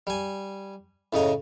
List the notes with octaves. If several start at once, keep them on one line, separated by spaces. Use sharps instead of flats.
G3 G#5
A2 C#3 D#5 A#5